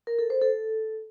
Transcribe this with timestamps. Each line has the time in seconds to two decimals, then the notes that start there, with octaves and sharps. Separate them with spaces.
0.07 A#4
0.19 A4
0.30 C5
0.42 A4